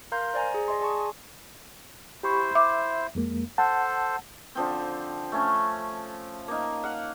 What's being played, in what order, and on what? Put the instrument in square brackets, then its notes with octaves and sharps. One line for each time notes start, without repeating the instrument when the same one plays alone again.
[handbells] A#4 F5 A#5 C6 G6
C5 D5 G#5 A#5
G#4
D5 D#5 G#5 C6
G#4 D5 A5 C6 C#6 D#6
G#5
[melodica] E4 C5 [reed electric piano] G4 B5 C#6
[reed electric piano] E5 [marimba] D6
[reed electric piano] F2 G#3 A#3
[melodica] A4 C5 [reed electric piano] F#5 A5
[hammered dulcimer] D3 F3 C4
A3 C#4
A#3 D#4
F5 F#5